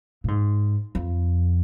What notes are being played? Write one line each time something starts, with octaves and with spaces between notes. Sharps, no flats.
A#2
G#2
F2